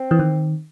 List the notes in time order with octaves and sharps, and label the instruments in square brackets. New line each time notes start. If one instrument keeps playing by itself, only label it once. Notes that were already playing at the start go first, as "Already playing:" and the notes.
Already playing: [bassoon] C4
[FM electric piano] E3
D#3